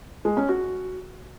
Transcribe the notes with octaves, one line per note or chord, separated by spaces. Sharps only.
G#3
C#4
F#4